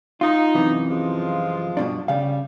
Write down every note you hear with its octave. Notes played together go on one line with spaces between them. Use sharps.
D#4 F4
F#2 C3 E3
F3 G#3 F4
G2 B2 D4
C#3 G3 F5